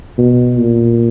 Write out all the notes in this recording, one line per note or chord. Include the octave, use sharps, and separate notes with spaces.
B2
A#2